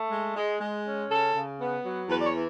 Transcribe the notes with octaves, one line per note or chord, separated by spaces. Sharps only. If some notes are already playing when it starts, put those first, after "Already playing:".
Already playing: A3
G#3
G#3
G#3
C#4
C#3 A4
C#3
B3
F#3
E2 B4
D5
C#5
E3